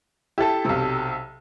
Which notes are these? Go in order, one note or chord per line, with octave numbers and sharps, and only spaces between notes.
E4 G4 A4 A5
B1 C3